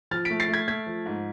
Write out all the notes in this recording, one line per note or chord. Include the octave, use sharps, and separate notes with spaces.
F3 F6 A6
A3 B6 D7
A6 C7
A3
G#6 B6
A3 G#6 B6
F3
G#2